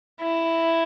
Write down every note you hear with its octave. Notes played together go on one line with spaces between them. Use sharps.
E4